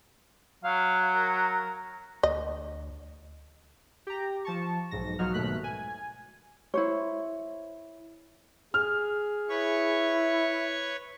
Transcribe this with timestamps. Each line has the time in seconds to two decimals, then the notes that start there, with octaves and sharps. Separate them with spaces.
0.64 F#3 F5
1.15 A#4
2.23 D2 D#5
4.07 G4 A#5
4.45 F3 A5 C#6
4.91 B1 G#2 A#6
5.19 B1 F3 F#3 D#4 F#4 F6
5.34 D#2 G#2 B2 A3 F#6 B6
5.64 G#5
6.74 E4 C5 C#5
8.74 G#4 F6
9.49 E4 B4 C#5 C#6